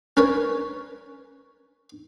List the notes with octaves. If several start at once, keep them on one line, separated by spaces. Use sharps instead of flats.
C#4 A#4 B4 C#5